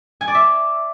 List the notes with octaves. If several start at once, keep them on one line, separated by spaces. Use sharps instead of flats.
G#5
D5
E5